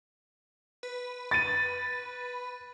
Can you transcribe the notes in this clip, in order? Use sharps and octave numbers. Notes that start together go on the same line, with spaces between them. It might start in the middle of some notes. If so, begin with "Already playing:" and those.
B4
A6 D#7